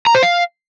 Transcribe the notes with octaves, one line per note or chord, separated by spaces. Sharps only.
A#5
C5
F5